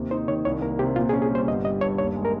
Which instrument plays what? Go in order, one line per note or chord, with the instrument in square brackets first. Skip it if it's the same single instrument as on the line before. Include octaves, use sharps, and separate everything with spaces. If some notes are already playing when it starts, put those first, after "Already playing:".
Already playing: [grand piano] D#2 C3
[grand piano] D#4 [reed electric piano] C5
[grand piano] D#3 [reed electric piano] C#5
[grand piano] C2 [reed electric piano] C#5
[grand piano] A#3 [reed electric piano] A#4
[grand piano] C3 [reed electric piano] G4
[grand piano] A#2 [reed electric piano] F4
[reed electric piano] G#4
[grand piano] C#4
[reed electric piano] G#4
[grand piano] G3 [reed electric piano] C5
[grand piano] G1 [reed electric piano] D#5
[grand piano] G3 [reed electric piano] D#5
[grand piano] G2 [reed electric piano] C#5
[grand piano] D#2 [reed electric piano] C#5
[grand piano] G#3
[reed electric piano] A#4